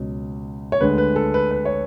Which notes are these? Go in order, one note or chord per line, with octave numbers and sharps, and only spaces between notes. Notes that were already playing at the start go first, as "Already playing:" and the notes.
Already playing: C#2 B2 F#3 C#4
C#5
D2 D3 G#3 B4
B4
A4
B4
B4
C#5